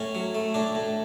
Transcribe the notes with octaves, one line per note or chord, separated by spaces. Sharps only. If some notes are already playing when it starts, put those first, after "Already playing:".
Already playing: A2 C#4
F#3
A3
A2 D4
A2